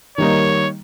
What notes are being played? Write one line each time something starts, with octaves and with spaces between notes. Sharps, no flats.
D#3 G3 A#3 D#4 C#5